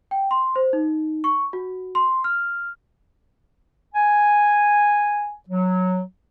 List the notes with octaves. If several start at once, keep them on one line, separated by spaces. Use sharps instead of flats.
G5
C6
C5
D#4
C#6
F#4
C6
F6
G#5
F#3